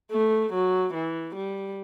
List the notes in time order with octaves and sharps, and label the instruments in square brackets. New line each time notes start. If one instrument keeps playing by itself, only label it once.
[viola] A3
F#3
E3
G3